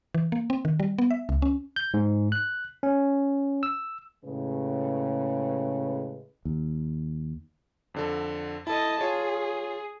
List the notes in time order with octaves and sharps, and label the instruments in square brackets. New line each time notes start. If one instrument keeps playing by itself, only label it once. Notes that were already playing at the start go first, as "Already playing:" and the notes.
[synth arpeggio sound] E3
A#3
C4
D#3
G3
B3
E5
C#2
C#4
[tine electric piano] G6
G#2
F#6
C#4
E6
[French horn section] A2 C#3 G#3 B4
[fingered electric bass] D#2
[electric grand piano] F2 D3 A4
[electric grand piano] E4 A4 [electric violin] D#5 A5
[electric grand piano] F4 C#5 [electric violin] G#4